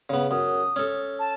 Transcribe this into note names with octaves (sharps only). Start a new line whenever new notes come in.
C#3 B3
F#2 D#6
C#4 A4
A5